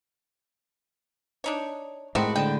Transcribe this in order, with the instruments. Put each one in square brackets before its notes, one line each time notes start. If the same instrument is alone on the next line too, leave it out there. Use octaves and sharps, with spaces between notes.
[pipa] D4 D#4 C#5
[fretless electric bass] A2 G#3 [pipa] D#3 C4 F#4 [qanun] A5 B5
[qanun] D3 D#5 A5 [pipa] G5